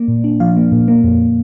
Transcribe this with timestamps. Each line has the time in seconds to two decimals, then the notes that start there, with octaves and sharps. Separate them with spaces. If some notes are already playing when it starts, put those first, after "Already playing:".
Already playing: A#3 D5
0.08 A#2
0.24 D4
0.40 F3 F5
0.56 A#3
0.72 A#2
0.88 A#3
1.04 F2